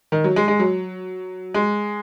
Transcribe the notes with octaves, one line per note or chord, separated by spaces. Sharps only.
D#3
F#3
G#3
G#3
F#3
G#3